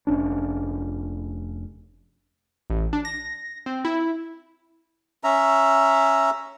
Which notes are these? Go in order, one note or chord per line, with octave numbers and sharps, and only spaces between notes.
F1 C#4 D4
A1
D4
A#6
C4
E4
C#4 E5 A#5